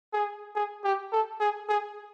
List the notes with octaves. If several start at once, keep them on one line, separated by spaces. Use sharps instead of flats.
G#4
G#4
G4
A4
G#4
G#4